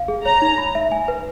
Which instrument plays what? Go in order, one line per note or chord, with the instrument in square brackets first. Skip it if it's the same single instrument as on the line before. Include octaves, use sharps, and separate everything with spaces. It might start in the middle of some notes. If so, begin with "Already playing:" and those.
Already playing: [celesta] F5
G#4
[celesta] C#5 [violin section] A#5
[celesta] D#4
B5
E5
G#5
B4